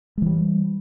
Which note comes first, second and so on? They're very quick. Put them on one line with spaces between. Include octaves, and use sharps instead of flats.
G#3 E3 G3